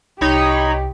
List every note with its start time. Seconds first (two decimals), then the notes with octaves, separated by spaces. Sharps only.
0.21 C2 D#4 G4 C#5 B5